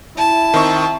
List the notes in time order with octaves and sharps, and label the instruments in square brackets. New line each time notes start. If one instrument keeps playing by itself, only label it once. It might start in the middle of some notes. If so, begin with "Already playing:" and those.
[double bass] E4 [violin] A5
[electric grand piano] D#3 C4 C#6